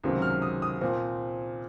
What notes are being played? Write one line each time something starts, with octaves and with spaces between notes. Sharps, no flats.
C#2 C3 D#3 F#3 C4
F6
D#6
D#6
A#2 F3 C4